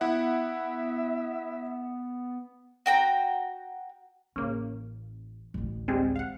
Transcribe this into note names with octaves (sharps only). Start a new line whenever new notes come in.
B3 E4 E5 F#5
F#4 G5 A#5
A1 C#3 A#3 C#4
A1 D2
G3 G#3 C4
F5 F#5